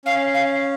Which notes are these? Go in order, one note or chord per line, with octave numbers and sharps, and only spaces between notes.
C#4 F5
F5